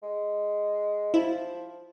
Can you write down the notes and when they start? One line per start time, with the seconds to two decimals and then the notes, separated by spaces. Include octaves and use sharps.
0.03 G#3
1.14 F3 E4